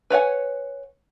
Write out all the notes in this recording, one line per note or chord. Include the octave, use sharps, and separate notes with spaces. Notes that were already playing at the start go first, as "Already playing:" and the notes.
B4 C#5 F#5 G#5